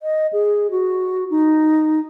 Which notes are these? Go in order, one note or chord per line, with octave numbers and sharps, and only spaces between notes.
D#5
G#4
F#4
D#4